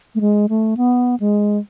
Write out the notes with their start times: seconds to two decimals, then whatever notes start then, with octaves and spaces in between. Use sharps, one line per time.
0.15 A3
0.21 G#3
0.49 A3
0.77 B3
1.20 G#3